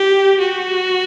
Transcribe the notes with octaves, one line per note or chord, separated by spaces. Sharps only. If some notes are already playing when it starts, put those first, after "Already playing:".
Already playing: G4
F#4